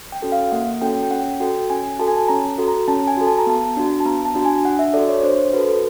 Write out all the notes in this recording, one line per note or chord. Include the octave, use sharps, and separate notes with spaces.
G5
C#4 F#4 A4
F5
A#3 F#5
C#4 F#4 A4 G5
G5
C#4 F#5
F#4 A4 G5
C#4 G#5
F#4 A4 A5
G#5
A5
C#4 A#5
F#4 A4
A#5
C#4 A5
G#5
F#4 A4
A5
A#5
B3 A5
D4 F#4
A5
B3 A#5
A5
D4 F#4
G#5
D4 F#5
E5
F#4 A4 D5
C#5
D4 C5
C5
F#4 A4 B4
A4